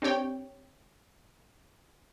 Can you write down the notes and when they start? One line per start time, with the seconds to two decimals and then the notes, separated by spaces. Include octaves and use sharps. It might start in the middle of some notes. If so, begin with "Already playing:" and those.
0.02 C4 D4 G4 C#5 G5